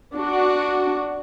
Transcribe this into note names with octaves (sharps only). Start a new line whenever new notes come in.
D4 F#4